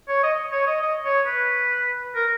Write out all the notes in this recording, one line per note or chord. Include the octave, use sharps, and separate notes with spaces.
C#5
D#5
C#5
D#5
D#5
C#5
B4
A#4